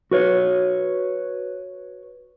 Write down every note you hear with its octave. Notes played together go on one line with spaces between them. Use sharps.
F#4 B4 C#5